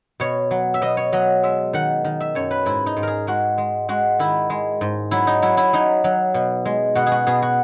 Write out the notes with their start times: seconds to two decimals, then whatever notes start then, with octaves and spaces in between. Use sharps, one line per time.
0.20 B2 C#5
0.51 F#3
0.74 E5
0.82 B2 D#5
0.97 C#5
1.12 F#3 D#5
1.43 G#3 E5
1.73 D#3 F#5
2.04 D#3
2.20 E5
2.35 F#2 C#5
2.51 B4
2.66 G#2 E4
2.86 D#4
2.97 G#2
3.03 G#4 A#4
3.27 G#3 F#4
3.58 G#3
3.89 G#3 F#4
4.19 D#3 E4
4.50 G#3
4.81 G#2
5.11 F#3 E4
5.27 D#4
5.42 F#3 E4
5.57 E4
5.73 F#3 D#4
6.04 F#3
6.34 B2
6.65 G#3
6.95 B2 F#4
7.07 G#4
7.12 F#4
7.27 B2 G#4
7.42 F#4